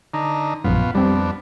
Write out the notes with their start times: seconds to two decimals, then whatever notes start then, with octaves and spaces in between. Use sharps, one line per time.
0.14 D3 D#4 A#5
0.64 A#1 F#2 B2 B3 F4
0.95 F2 G3 B3 C4 D4